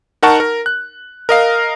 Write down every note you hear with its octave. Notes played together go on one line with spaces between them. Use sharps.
D#4 A#4 F#5 A5 C#6
A#4
F#6
A#4 D#5 F5